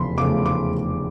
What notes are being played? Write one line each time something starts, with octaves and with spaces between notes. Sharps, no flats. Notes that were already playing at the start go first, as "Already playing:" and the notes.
Already playing: F1 E2 C#3 F3 A3 B5 C6
F1 E2 C#3 F3 A3 D6
D6